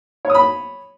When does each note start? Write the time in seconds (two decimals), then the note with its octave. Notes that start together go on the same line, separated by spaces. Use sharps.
0.25 C#5
0.30 D#6
0.35 B5